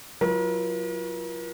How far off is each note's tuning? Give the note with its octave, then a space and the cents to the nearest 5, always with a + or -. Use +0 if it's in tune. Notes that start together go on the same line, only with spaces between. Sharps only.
F#3 -25 F4 -45 A#4 +45